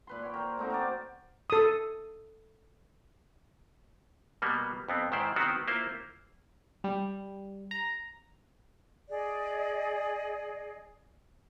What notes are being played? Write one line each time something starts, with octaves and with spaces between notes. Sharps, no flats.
A#2 B4 C6
C#5 G5
A#4 C5
A3 C4 D#4 F#4
A#4 C5 D5
A4 D#6
B2 G3 A#3 B3
F2 B3 C4
G#2 D#3 E4 C5 D5
D#3 B3 C4 F#4 G4
A#3 E4 F4 C5
G3
A#5
G#4 D5 D#5